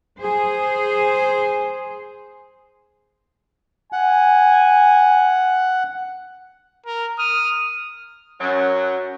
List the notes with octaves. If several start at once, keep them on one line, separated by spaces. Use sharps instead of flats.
G#4 C5
F#5 G#5
A#4
D#6 F6
F#2 F#3